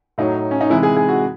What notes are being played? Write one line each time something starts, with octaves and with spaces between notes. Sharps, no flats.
A2 F#3 D#4
C#4
D#4
C3 E3 G#3 E4
G#4
G#4
F#4